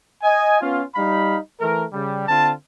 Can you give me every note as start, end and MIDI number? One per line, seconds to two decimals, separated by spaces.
0.23 0.59 75
0.23 0.59 80
0.61 0.82 59
0.61 0.82 61
0.61 0.82 65
0.95 1.38 55
0.95 1.38 63
0.95 1.38 77
0.95 1.38 83
1.60 1.84 52
1.60 1.84 57
1.60 1.84 70
1.92 2.27 49
1.92 2.27 55
2.28 2.51 50
2.28 2.51 60
2.28 2.51 65
2.28 2.51 81